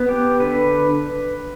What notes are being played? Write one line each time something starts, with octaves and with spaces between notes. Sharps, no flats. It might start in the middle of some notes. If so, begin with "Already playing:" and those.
Already playing: B3
G4
D3 B4